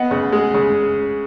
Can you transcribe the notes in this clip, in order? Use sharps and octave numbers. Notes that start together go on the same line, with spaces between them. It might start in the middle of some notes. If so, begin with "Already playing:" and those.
Already playing: B3 D#5 F#5
C#3
G#3
C#3